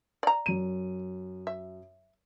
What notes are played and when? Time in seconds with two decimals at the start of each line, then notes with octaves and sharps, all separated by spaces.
0.23 D5 A#5
0.46 F#2 D#7
1.47 E5